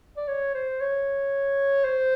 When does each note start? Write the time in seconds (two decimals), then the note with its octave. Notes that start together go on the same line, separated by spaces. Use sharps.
0.17 D5
0.28 C#5
0.54 C5
0.81 C#5
1.84 C5